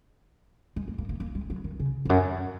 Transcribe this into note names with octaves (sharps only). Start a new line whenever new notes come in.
G#3
A#3
A#3
A#3
A#3
G#3
F#3
D#3
C#3
F2
F#2